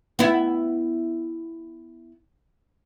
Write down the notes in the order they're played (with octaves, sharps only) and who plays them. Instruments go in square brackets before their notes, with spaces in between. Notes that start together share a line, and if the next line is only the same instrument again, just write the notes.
[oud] B3 E4